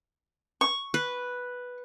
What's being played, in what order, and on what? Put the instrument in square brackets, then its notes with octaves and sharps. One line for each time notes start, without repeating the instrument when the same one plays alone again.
[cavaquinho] C#6
[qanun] B4